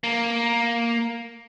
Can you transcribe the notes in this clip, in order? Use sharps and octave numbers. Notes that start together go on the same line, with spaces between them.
A#3